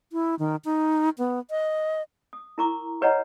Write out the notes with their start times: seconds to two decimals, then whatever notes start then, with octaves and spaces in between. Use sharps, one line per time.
0.13 E4
0.39 D#3
0.65 D#4
1.18 B3
1.51 D#5
2.33 D#6
2.58 E4 A#4 A#5 C#6 D6
3.01 G4 B4 C#5 D#5 F#5 A#5